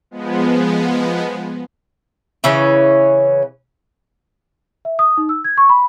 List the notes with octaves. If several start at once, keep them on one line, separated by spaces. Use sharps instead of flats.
F3 G#3 B3
C#3 E3 C#4
E5
D#6
D#4
E6
G#6
C#6
B5